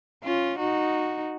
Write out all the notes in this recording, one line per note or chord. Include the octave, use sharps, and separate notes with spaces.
C#4 F4
D#4 F#4